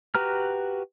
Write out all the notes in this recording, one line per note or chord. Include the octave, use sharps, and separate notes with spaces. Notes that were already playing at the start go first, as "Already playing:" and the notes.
F#4 G4 B4 A#5 F6